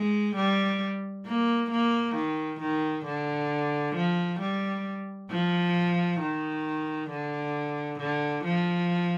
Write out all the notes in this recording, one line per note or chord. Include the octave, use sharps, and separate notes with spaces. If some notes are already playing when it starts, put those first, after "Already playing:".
Already playing: G#3
G3
A#3
A#3
D#3
D#3
D3
F3
G3
F3
D#3
D3
D3
F3